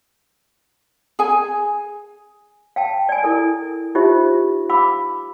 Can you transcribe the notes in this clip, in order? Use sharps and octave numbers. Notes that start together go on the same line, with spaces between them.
G#4 G#5
F5 G5 A5
D5 G#5
E4 A4 A#4
D#4 F4 G4 C5 E5
F5 B5 D6 E6